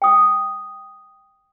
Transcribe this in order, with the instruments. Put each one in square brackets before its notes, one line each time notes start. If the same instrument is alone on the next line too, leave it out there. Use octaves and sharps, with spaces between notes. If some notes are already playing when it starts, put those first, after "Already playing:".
[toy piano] G5 D#6